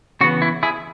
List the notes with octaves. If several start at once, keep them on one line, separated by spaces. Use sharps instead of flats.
C#3 E3 B3 F#4
E4
E4 G#4